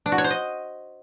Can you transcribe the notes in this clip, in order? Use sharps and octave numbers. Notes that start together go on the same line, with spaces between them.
D4
F#4
C#5
C5
D#5